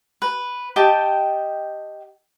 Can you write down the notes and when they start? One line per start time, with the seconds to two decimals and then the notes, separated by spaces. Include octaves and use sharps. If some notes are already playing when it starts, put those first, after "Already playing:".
0.22 B4
0.76 G4 D#5 G5 A5